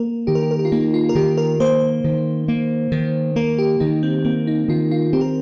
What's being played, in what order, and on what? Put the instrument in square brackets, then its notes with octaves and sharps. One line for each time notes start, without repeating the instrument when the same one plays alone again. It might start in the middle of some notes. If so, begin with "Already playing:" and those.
Already playing: [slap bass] A#3 [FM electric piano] A#4
[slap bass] D#3 [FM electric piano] G4
[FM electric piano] A#4
G4
A#4
G4
F4
[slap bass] A#3 [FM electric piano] D#4
[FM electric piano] F4
A#4
[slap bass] D#3 [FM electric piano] G4
[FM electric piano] A#4
[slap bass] A#3 [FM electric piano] C5
[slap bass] D#3
A#3
D#3
[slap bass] A#3 [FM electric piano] A#4
[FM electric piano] G4
[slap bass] D#3 [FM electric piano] D#4
[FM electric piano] C4
[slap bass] A#3 [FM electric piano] C4
[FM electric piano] D#4
[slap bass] D#3 [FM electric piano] F4
[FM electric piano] F4
[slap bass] C4 [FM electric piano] G4
[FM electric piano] A#4